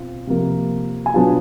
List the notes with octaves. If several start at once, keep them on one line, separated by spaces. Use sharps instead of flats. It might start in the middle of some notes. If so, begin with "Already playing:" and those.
Already playing: B2 C4 F4
C3 F3 A#3
G#5
B2 F#3 B3 D4 F4 A5